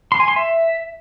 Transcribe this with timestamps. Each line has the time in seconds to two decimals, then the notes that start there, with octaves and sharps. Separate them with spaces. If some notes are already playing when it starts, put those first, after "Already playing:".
0.12 C6
0.20 G#5
0.28 C6
0.36 E5